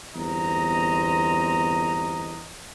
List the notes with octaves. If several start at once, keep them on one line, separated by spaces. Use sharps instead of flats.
G1 E2 C4 D#5 A#5